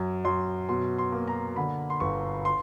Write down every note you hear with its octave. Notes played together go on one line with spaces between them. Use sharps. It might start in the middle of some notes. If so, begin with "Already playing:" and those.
Already playing: F#2
F#2 C6
B2 C6
C6
A#3
A#5
D3 B5
C6
G1 C#6
C6